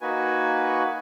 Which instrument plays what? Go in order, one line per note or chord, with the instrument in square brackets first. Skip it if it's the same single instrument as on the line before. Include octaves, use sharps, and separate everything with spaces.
[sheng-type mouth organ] A#3 D#4 F#4 B4 G#5